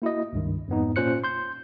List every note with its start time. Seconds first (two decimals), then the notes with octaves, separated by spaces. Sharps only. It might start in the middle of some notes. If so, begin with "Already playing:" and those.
0.02 A#3 E4 F#4 D#5
0.33 C#2 G2 D#3
0.68 F2 G#2 B3 D#4
0.96 A#2 C#4 F4 C5 F#6 C#7
1.24 C6 G6